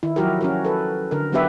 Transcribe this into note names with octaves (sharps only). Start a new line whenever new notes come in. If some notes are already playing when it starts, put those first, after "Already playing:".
D#3 E4
F3 F#3 E4 F#4 G4 A#4
C#4 F#4 A#4
A4 B4
D3 A#4
F#3 B3 D4 G4 B4 E5